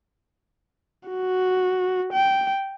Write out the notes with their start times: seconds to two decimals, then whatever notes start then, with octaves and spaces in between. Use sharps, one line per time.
1.09 F#4
2.13 G5